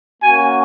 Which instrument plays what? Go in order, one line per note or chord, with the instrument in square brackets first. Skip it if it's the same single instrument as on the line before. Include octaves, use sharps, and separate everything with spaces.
[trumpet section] A#3 C#4 F#4 G#5